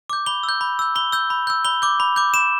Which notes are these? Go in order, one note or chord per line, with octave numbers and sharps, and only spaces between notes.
D6 G6
B5 G7
E6
G6
B5
E6 G6
B5 G7
E6 G6
B5
E6 G6
B5 G7
D6 G6
B5
D6 G6
B5 E7